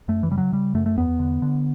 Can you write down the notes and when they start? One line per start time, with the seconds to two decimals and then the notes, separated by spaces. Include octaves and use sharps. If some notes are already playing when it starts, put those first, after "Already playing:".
0.08 F#2 A3
0.23 E3
0.31 C#3 G3
0.38 F#3
0.52 C#3 G3
0.74 F#2 A3
0.86 A3
0.98 E2 B3
1.19 D3
1.42 D3